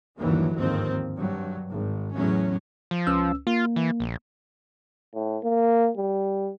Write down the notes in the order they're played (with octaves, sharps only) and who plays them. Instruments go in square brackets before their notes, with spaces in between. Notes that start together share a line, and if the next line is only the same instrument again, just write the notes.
[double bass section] G1 D#2 D3 E3 F#3
G1 D#2 G#2 D#3 F3 C4
G2 F#3
G#1
E2 A2 F#3 C#4
[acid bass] F3
[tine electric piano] C#2 C#4 E6
[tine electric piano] A#3 [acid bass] F4
[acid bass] E3
A#1
[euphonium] A2
A#3
G3